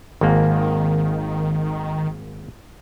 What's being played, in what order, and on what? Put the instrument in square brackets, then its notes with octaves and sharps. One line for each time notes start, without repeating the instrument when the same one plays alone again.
[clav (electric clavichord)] G#1 A#3 [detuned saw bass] D#3